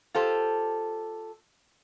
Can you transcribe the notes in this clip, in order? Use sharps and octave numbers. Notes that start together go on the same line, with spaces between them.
F4 G4 A4 C5